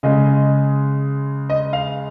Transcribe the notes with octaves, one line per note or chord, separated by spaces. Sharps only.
C#3 G#3 D#5
D#5
F5